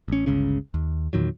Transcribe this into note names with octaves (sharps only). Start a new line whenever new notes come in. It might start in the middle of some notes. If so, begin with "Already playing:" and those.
A1 C#4
G1 C#2 C#3 C#4
D#2
E2 A#2 D#3 F#3